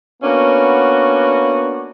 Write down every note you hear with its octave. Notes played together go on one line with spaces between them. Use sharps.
A#3 B3 C#4 D4 F#4